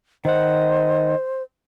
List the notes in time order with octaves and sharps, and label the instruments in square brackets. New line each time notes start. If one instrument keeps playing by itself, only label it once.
[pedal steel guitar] D#3 F#5 [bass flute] C5 [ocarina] D#5